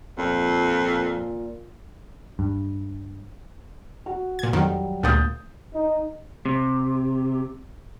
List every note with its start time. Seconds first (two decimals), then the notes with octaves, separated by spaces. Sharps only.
0.18 F2 A#2
2.39 G2
4.06 F#4
4.39 A#2 G#6
4.53 F2 D#3 F#3 G3
5.03 D2 A#2 G#3 D#6 G6 A6
5.74 D#4
6.45 C3